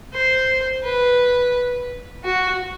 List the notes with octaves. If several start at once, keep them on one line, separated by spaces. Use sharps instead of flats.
C5
B4
F#4